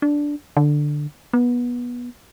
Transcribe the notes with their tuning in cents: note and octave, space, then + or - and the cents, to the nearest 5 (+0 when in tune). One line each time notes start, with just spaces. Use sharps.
D4 -5
D3 +10
B3 -20